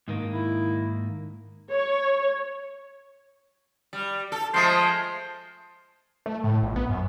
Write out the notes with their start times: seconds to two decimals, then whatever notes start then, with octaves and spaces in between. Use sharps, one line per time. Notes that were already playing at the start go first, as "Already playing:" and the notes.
0.08 G#2 D#3 A#3
0.33 E4
1.71 C#5
3.93 G3
4.32 A4
4.54 F3 G#3 A3 C5
6.26 A3
6.44 A2
6.63 A#1
6.76 B3
6.89 F#2